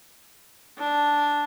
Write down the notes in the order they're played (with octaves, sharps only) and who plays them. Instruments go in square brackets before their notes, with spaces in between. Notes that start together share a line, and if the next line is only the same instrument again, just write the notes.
[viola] D4